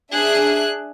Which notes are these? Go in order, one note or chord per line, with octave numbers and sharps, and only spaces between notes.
D4 G#4 E5 F#6